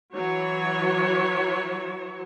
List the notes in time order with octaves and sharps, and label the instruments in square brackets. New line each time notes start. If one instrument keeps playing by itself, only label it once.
[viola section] E3 F#3 C#5